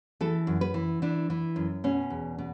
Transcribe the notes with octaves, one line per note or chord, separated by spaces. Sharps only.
E3 A4
F#2
B4
E3
E3 D4
E3
F#2
B2 C#4
E2
B2